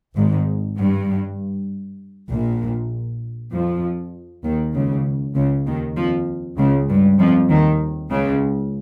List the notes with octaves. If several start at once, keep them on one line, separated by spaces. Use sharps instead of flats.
G#1 G#2
G2
A#1 A#2
F2 F3
D#2 D#3
C#2 C#3
C#2 C#3
D#2 D#3
F2 F3
C#2 C#3
G2
F2 F3
D#2 D#3
C#2 C#3